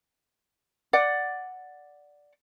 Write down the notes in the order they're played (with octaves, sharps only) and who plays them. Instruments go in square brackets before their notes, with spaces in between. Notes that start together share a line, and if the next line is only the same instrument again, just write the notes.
[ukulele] D5 F#5